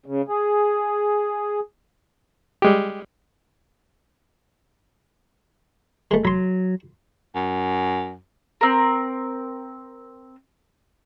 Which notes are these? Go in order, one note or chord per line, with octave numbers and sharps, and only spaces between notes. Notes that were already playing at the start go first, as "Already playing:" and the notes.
C#3
G#4
G3 G#3 G4
G#3 A3
F#3 B5 C6
F#2
C4 A#4